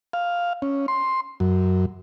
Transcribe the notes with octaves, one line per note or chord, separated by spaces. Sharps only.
F5
C#4
C6
F#2